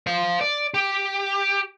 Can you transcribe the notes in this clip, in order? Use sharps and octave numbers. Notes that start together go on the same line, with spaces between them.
C5 F5
D5
G4